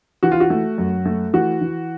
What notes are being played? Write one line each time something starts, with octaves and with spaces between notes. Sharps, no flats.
E3 F#4
F4
F#4
A3
F#2
A3
E3 F#4
E3